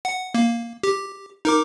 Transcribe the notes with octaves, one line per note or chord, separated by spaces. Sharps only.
F#5
A#3
G4
D#4 A#4 D6